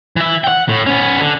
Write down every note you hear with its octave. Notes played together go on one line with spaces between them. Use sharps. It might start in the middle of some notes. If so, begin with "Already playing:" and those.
E3 E5
F#5 G5
A2
B3 C#4
D3